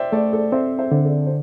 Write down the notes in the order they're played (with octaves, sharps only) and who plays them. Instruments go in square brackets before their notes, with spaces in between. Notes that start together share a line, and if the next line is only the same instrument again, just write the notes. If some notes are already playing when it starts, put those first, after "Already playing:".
Already playing: [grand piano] C5 D5 E5 G5
[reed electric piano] A3 [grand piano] A4 D5
[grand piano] A4 D5
[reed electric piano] C4 [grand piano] C5 E5
[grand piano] C5 E5
[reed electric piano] D3 [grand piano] C5
[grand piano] A4 D5
C5